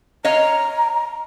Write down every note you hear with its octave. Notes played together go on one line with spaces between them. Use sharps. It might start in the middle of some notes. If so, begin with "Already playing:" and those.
C#5 D#5 F5 A#5